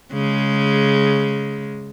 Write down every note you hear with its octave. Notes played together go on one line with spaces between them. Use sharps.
C#3 G#3